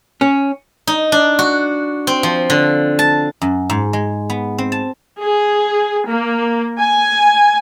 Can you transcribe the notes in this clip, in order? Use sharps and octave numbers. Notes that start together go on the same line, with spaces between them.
C#4
D#4
D4
F#4
C4
F3
D3
A5
F#2
G#2
G#3
B3
C4
A5
G#4
A#3
G#5